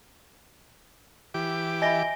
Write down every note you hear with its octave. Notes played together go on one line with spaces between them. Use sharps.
E3 G4 D6
D#5 E5 G#5 B5 A#6 G7